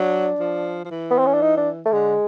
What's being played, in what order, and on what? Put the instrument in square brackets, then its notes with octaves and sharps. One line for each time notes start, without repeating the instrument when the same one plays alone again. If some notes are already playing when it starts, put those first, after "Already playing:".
Already playing: [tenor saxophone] F#3 [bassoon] D4
[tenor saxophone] F3
F3
E3
[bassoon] B3
C4
C#4
D4
D#4
D4
A3
[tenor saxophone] D3 [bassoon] G#3